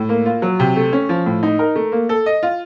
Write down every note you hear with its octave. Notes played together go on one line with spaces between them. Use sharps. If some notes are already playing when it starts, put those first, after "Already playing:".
Already playing: A2
A#3
F4
F#3
C3
A3
C#4
F3
A2
D#4
A#4
A3
A#3
A4
D#5
F4